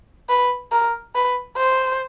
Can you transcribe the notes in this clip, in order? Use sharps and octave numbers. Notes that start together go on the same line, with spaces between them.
B4
A#4
B4
C5